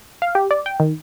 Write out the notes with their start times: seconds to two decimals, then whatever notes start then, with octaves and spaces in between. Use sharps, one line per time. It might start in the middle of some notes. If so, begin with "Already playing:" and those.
0.22 F5
0.35 G4
0.51 D5
0.66 G5
0.80 D#3